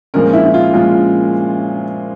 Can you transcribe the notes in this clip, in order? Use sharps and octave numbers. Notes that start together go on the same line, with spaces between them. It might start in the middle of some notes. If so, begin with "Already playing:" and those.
A#2 F3 G#3 C#4 A#4
E4
E4
F4
A#2 F3 G#3 C#4 F4